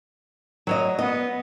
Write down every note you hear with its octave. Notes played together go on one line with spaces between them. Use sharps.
F#3 C#5 D#5
B3 D#5